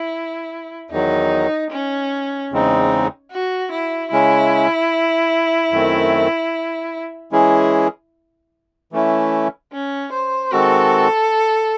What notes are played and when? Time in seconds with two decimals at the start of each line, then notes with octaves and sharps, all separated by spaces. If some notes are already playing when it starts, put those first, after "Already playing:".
Already playing: E4
0.91 E2 D#3 F#3 D#4
1.71 C#4
2.52 E2 C#3 G#3 C4 D#4
3.32 F#4
3.72 E4
4.11 C#3 G#3 C#4 E4
5.71 F#2 D#3 A3 C4
7.32 E3 G#3 C#4 E4 G#4
8.92 E3 A3 C#4 E4
9.72 C#4
10.12 C5
10.52 D#3 G#3 C4 F#4 A4